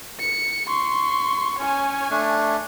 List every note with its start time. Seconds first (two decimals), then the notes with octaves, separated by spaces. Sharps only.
0.20 C#7
0.68 C6 C#6
1.59 C#4 C#5 G#5
2.10 A3 D4